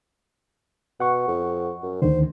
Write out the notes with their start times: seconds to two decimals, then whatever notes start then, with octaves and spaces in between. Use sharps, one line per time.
1.00 B2 F#5 C#6
1.28 F2
1.83 F#2
2.02 D2 D3 D#3 C5